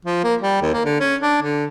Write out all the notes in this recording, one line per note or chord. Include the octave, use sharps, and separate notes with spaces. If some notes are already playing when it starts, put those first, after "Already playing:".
F3
A#3
G3
D#2
A#3
D3
C#4
D4
D3